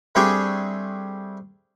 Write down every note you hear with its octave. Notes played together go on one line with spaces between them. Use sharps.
G3 A3 C4 D4 G4 G#4